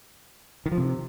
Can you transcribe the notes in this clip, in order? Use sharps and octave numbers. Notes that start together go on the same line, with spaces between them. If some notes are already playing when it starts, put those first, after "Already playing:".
D#3
F3
C3